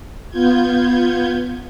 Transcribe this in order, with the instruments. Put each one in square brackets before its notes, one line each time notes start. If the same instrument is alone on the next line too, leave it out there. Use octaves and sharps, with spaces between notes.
[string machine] B3 F4 G6 G#6